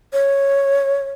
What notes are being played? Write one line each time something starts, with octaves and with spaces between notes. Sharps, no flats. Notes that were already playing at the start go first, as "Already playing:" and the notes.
C#5